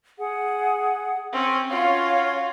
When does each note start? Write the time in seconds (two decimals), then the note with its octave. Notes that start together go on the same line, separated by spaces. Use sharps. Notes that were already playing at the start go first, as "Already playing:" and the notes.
0.18 G#4 F#5
1.33 C4 C#4
1.69 C#4 F4 F#4 C#5 F5